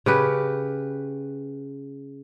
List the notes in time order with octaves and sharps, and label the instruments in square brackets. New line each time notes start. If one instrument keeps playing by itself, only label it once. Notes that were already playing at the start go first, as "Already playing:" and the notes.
[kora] C#3 G4 B4